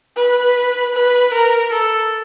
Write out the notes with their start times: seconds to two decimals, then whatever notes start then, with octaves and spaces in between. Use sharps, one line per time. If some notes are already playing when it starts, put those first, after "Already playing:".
0.16 B4
0.94 B4
1.34 A#4
1.73 A4